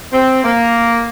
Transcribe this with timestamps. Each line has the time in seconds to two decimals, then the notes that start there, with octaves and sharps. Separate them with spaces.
0.12 C4
0.44 A#3